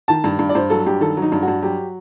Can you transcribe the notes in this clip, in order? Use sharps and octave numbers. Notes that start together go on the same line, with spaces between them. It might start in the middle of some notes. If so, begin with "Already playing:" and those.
D#3 A5
G2
G2
D5
G2 C5
F#3 A4
G2 G4
D#3 A4
F#3
D#4
G2
F#4
G2
F#3 G4